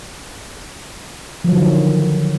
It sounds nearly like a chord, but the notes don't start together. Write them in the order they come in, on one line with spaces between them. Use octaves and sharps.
F3 F#3 D#3 D3